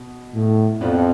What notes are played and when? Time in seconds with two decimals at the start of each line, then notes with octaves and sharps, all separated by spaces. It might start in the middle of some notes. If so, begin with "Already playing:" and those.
Already playing: B2
0.34 A2
0.80 F2 B2 B3 D4 F4